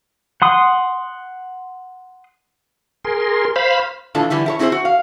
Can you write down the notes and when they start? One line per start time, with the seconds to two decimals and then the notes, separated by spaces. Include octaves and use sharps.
0.42 F#5 C6 D#6
3.05 G#4 A#4 C6
3.56 C5 F5 B5
4.15 A2 E3 D4 F4 A4
4.30 D3 E3 G3 E4
4.46 E4 A4 C#5
4.59 C4 E4 G#4 A#4 C5
4.72 F#4
4.85 F5